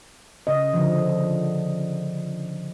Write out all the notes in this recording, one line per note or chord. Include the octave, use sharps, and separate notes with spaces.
C#3 D#5
D3 F3